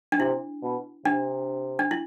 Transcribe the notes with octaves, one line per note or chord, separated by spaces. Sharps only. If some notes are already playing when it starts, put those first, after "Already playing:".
D4
C3 E4
B2
C3 D4
D4
E4